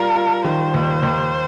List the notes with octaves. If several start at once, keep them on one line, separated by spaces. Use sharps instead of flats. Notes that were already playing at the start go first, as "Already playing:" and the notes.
Already playing: G3 F4 A#4
F4
D#3 C5
D#2
D#2